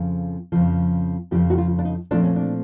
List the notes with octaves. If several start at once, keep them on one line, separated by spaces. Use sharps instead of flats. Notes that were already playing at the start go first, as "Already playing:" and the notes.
Already playing: F2 C#3 F3
F2 C#3 F3
F2 C#3 F3 G4
F#4
F4
D4
D#4
A#2 F3 A3 C4 D4
C#4
D4